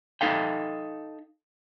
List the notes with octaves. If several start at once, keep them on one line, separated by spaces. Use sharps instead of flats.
D#4 A4 F5 G5